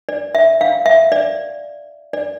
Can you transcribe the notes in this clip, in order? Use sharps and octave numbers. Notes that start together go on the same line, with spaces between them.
D5
E5
F5
E5
D5
D5